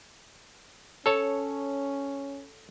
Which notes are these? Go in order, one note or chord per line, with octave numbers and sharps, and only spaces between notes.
C#4 A4 C#5 A5